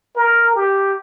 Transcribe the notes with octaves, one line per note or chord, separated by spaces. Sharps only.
A#4
G4